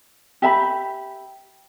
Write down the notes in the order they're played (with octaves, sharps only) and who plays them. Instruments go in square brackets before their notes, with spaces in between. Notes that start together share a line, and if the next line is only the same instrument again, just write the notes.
[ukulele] G4 E5 A5 B5